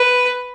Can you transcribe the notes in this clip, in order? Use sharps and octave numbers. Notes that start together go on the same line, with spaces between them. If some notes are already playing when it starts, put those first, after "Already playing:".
Already playing: B4